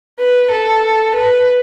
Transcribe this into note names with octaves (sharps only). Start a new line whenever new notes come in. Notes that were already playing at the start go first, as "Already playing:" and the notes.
B4
A4
B4